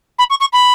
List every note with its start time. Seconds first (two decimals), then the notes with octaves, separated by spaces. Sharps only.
0.19 B5
0.30 C#6
0.40 C#6
0.53 B5